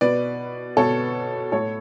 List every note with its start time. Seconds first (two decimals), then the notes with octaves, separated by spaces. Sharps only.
0.01 B2 B4 D5
0.77 B2 A4 C#5
1.52 A2 A4 C#5